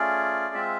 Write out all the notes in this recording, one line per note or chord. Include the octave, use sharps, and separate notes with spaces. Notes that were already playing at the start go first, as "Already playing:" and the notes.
Already playing: A3 C#4 F4 G#4 D5
G#3 C4 F4 E5